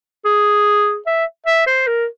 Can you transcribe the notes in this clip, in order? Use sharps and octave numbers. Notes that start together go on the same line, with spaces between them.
G#4
E5
E5
C5
A#4